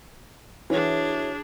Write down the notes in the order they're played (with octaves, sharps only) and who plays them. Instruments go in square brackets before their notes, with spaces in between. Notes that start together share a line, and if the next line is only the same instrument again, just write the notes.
[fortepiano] E3 [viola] D4 G#4 [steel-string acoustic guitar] E4 F#4 C#5